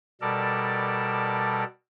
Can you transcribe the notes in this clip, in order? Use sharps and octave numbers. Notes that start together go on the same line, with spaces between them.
B2 G3 A4 A#4 D5 A5